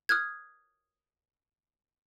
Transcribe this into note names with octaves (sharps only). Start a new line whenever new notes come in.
D#6 F6 F#6 G#6